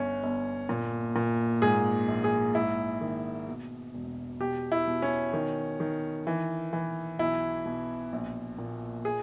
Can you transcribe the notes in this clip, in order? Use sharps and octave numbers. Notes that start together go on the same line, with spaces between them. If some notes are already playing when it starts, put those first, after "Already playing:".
Already playing: G1 C#4
G1
A#2
A#2
G#2 G#4
A#1
G#4
G#2 E4
D#3
B2
E1
B2 G4
E4
B2
C#4
D#3
D#3
E3
E3
B1 E4
B2
A#1
A#2
G#4